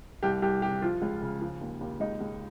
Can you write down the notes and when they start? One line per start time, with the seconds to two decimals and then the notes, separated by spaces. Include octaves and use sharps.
0.23 C2 G4
0.42 C2 G4
0.62 C3 G4
0.82 F3 F4
1.02 C#2
1.22 C#3
1.42 F3
1.61 D#2
1.81 D#2
2.00 C#2 D#4
2.21 C#2